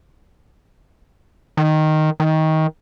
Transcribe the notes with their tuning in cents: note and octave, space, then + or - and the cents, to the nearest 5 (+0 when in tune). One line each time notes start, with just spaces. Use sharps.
D#3 -5
D#3 +20